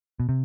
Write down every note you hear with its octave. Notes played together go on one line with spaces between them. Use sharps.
B2
C3